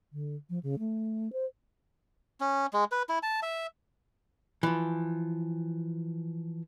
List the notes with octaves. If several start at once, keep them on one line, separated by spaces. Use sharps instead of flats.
D3
F3
C#3
A3
C5
C#4
G#3
B4
E4
A5
E5
E3 F3